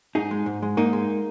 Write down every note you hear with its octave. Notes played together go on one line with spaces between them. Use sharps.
G#2 D#4 G#4
G#3
G#2
G#3
G#2 A#3 D#4
G#3